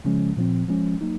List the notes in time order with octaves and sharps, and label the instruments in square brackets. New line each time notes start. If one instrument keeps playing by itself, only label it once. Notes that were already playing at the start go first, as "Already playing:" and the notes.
[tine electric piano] C#3 F3 G#3 C#4
A#2 F3 C4
F3 G#3 C#4
F#3 A#3 D#4